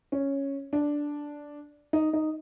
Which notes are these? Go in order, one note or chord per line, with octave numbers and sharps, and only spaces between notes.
C#4
D4
D#4
D#4